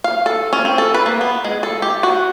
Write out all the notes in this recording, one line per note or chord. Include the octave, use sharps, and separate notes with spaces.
F5
A4
C#4
C4
A4
B4
A#3
B3
G#3
A4
G4
F#4